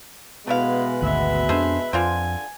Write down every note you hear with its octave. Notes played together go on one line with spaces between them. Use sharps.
B2 G#3 A3 B3 E4 B4 F5
G#1 D2 B4 E5
F2 D4 G#4 A4 C5
F2 D3 F4 C5 G#5